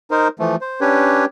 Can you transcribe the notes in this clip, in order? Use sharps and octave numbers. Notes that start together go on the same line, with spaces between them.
D#4 A#4 C5
E3 F3 A3
C5
C#4 D4 G4 B4 C#5